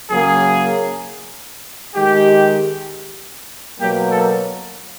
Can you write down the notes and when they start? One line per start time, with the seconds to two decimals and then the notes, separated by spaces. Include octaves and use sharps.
0.11 C#3 F#3 A#3 G#4
1.95 D#3 G#3 G4
3.79 B2 F#3 A#3 G4
4.11 A4